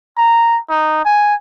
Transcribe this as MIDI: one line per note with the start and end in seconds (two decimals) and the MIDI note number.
0.17 0.59 82
0.70 1.01 63
1.05 1.35 80